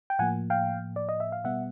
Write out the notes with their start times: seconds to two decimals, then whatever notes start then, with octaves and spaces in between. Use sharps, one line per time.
0.10 G5
0.19 A2 F3 A#3 F#5 G#5
0.50 F5 G5
0.96 D5
1.09 D#5
1.20 E5
1.32 F5
1.44 B2 G3 B3 E5 F#5